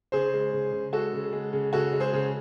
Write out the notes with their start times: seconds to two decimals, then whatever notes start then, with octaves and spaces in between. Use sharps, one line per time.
0.12 C#3 G#4 C5
0.33 G#3
0.53 C#3
0.72 C#3
0.93 G#3 F#4 A4
1.13 C#3
1.33 G#3
1.53 C#3
1.73 C#3 F#4 A4
1.93 G#3
2.00 G#4 C5
2.13 C#3